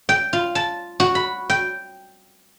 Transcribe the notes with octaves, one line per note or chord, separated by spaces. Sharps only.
G5
F4
A5
F#4
B5
G5